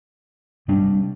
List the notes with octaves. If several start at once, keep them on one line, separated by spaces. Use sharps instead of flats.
C3 G3 D4